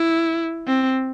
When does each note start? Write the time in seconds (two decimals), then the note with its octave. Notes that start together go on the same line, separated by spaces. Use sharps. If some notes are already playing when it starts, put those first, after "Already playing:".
Already playing: E4
0.67 C4